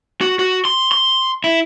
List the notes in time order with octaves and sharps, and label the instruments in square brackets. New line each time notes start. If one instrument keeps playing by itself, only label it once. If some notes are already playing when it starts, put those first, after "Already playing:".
[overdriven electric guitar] F#4
F#4
C6
C6
E4